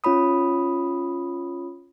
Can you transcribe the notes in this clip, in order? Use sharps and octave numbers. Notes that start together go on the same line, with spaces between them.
C#4 F4 C#5 B5 D#6